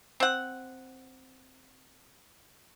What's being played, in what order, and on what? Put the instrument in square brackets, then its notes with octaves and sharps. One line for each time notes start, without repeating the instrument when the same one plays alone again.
[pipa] C4 F#5